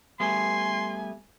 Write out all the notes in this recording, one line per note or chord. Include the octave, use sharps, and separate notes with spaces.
G3 A3 B3 G#5 C6